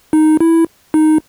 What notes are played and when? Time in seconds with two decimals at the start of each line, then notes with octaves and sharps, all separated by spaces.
0.13 D#4
0.40 E4
0.94 D#4